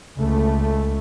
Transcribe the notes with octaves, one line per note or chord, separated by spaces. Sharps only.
C#2 A3